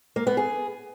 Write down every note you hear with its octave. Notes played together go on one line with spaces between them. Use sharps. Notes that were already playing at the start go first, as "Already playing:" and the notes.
A#3
B3
G#4